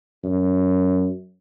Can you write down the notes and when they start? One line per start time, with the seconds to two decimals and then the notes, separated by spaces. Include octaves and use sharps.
0.24 F#2